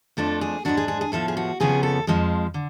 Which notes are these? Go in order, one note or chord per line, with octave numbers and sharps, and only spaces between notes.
F2 F3 A3 D4 A4
G#4
G#2 G#3 D4 F#4
G#4
G#4
G#4
A2 F3 B3 A4
G#4
F#4
F2 C#3 F3 B3 G#4
A4
F2 F3 G#3
D3